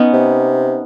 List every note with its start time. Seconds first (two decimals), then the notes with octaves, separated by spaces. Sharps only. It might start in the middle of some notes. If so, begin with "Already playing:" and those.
Already playing: B3 C#4 D#4
0.13 C3